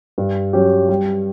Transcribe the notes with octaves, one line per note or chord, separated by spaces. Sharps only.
G2
F#3 C#4 G4
G3